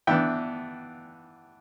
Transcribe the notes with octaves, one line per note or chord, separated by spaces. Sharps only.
E3 B3 D4 E5 G5